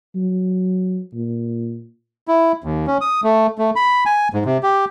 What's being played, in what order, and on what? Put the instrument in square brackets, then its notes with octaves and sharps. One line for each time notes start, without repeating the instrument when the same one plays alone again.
[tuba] F#3
A#2
[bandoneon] E4
D#2
C#4
D#6
A3
A3
B5
G#5
G#2
C3
G4